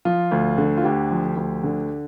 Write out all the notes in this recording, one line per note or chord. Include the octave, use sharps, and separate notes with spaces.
F3 F4
D2
D3
F4
D2 G4
F3
D2
D3